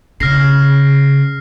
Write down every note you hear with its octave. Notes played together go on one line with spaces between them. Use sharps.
C#3 F6 A#6 C7